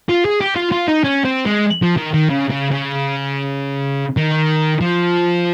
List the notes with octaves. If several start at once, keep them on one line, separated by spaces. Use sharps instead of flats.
F4
G#4
G4
F4
F4
D#4
C#4
C4
G#3
F3
D#3
D#3
C#3
C#3
C#3
D#3
F3